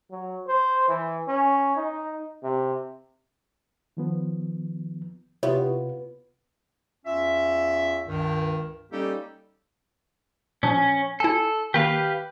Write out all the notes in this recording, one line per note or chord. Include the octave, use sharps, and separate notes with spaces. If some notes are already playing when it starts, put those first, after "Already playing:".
F#3
C5
E3
C#4
D#4
C3
D#3 F3 B3
C3 B3 E4 F4 G4 C#5
E2 C#4 F4 E5
C#2 G2 D#3
G3 A#3 C#4 D#4 G4 A4
A#2 F3 C#4 D4
E4 A4 G#5
D#3 A#3 G4 B4 F5